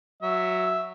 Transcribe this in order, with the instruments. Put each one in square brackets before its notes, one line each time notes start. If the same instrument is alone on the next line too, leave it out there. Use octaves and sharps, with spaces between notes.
[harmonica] F#3 E5